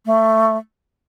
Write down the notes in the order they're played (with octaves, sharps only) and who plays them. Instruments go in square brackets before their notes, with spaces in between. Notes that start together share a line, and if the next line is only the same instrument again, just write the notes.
[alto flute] A3